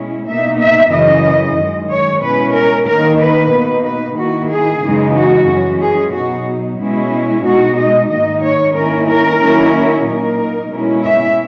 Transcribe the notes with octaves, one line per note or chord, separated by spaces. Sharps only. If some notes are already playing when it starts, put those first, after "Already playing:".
Already playing: B2 G#3 C#4 E4
B2 A#3 D#4 E5
E5
F#2 C#3 E3 D#5
F#2 D#3 G#3
C#5
B2 G#3 C#4 E4 B4
A#4
D#3 A#3 D#4 A#4
B4
B2 A#3 D#4
B4
D#3 A#3 E4 F#4
G#4
F#2 C#3 E3 G#3 D#4
F#4
F#2 E3 G#3 C#4
G#4
B2 F#3 B3 D#4 F#4
B2 G#3 C#4 E4
B2 G#3 D#4 F#4
D#5
G#2 D#3 A#3 D#4 D#5
C#5
D#3 A#3 C#4 E4 A#4
A#4
D#3 F#3 A#3 C#4 E4
A#2 A#3 D#4 A#4
B2 G#3 C#4 E4
E5